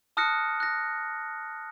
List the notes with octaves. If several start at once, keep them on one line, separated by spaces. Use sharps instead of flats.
A5 D#6 F6 F#6 A#6 C#7
F#6 A#6